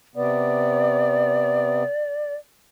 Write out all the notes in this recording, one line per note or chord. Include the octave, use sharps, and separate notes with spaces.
C3 B3 D5